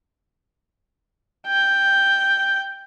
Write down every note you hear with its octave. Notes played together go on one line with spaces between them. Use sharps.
G5